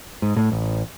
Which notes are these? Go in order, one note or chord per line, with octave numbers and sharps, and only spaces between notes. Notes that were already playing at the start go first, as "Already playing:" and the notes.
G#2
A2
A1